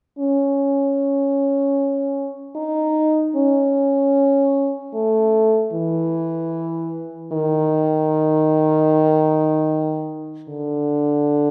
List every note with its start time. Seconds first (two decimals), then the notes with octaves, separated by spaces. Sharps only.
0.19 C#4
2.56 D#4
3.36 C#4
4.94 A3
5.73 E3
7.32 D#3
10.49 D3